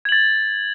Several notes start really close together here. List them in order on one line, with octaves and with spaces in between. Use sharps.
G#6 F#7 A6